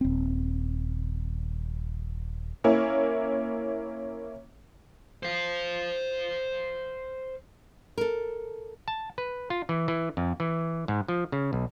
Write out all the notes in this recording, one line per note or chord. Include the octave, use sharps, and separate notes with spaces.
D#1 C4
A#3 C#4 E4
C5 F5
A4 A#4
A5
B4
F4
E3
E3
F2
E3
G#2
F3
C#3
B1